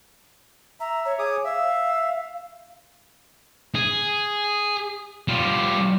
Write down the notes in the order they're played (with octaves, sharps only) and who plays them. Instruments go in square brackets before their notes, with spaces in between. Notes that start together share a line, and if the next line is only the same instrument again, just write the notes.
[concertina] E5 [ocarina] A#5
[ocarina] C#5
[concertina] G#4 D6 D#6
[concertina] E5 [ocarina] F5
[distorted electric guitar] G#4
G3 F4